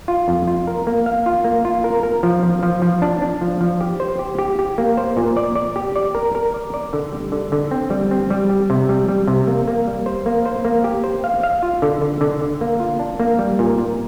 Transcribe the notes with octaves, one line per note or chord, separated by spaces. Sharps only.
F4
F2
F4
A#4
A#3
F5
F4
A#3
F4
A#4
A#4
F3
F3
F3
F3
D4
D4
F3
F3
G4
C5
G4
G4
G4
A#3
C5
A#2
D5
D5
G4
D5
A#4
A#4
D5
D5
D3
G3
D3
D3
C4
G3
C4
G3
G4
C3
G3
G3
C3
A#3
A#3
G3
C5
A#3
C5
A#3
G4
C5
F5
F5
F4
D3
D3
D3
D3
A#3
F4
D4
A#3
G3
A#2
A#2